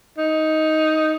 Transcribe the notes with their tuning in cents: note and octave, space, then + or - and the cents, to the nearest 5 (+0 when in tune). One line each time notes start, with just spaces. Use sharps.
D#4 +10